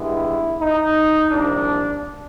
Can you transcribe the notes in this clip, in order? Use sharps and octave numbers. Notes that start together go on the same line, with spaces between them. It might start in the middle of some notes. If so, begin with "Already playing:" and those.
Already playing: G2 D#3 G#3 B3 E4
D#4
C2 A#2 F3 D4